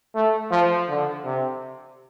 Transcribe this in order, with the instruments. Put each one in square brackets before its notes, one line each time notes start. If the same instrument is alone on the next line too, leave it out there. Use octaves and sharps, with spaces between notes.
[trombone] A3
F3
D3
C3